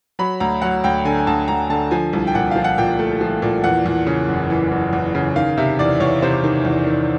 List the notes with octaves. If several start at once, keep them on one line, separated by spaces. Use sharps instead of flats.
F#3 B5
D2 A#5
F#3 F#5
D2 G5
D3 G#5
G#5
D2 A5
D2 A#5
D3 A5
F3 G#5
C2
G5
A#2 F#5
F3 F5
F#5
A#2 G5
A3
F3
A#2
E2 F#5
E2
C#3
F#1
E3
F#1
E2
C#3
D#3 F5
C3 E5
E2 D5
E2 C#5
C3 C5
D#3
E2
D#3